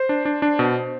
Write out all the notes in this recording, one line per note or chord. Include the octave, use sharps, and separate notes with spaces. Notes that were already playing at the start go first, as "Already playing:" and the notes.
Already playing: C5
D4
D4
D4
B2